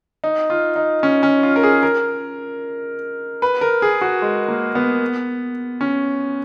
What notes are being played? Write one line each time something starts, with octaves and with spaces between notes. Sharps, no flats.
D#4
F4
D#4
C#4
C#4
F4
A#4
G#4
A#4
B4
A#4
G#4
F#4
G#3
A#3
B3
C#4